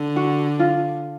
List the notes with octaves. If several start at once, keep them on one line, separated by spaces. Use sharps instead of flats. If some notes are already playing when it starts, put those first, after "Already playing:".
Already playing: D3
F#4
F4